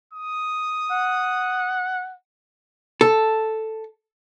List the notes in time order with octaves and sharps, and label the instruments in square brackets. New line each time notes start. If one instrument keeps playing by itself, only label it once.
[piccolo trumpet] D#6
[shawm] F#5
[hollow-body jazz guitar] A4